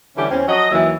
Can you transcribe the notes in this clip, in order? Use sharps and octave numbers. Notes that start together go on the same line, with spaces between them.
D3 E3 G3 C#4 G4
E2 C4 C#4
F3 F#3 D#5
D#2 D#3 E3 F#3 E5